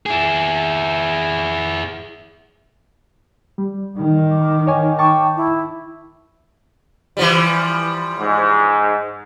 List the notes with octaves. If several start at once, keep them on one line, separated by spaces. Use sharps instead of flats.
E4 G#4
G3
D#3
D6
C#5 G#5
G5 A5 C#6 D6
E4
E3 F3 G3
G#2